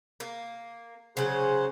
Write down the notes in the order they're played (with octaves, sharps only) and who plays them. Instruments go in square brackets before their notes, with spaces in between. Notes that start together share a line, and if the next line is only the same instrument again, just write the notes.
[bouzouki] A#3
[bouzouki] C#3 F#3 C#4 [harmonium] G#4 C5 F#5